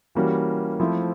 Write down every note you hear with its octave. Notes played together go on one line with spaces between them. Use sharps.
E3 G3 A#3 C#4 F#4
F3 A3 C4 E4